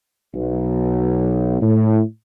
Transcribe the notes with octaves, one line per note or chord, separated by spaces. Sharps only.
B1
A2